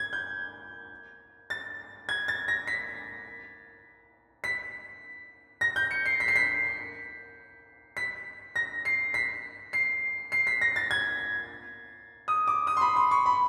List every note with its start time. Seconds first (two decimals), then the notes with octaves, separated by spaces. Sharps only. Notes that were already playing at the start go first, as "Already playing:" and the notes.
Already playing: G#6
0.13 G6
1.50 A6
2.09 G#6
2.28 A6
2.48 A#6
2.67 B6
4.44 B6
5.61 A#6
5.76 G6
5.91 C#7
6.06 C7
6.20 B6
6.28 C7
6.36 B6
7.97 B6
8.56 A#6
8.85 C7
9.14 B6
9.73 C7
10.32 C7
10.47 B6
10.61 A#6
10.76 A6
10.91 G#6
12.28 D#6
12.47 D6
12.67 D#6
12.77 C6
12.81 B5
12.96 C6
13.11 C#6
13.26 B5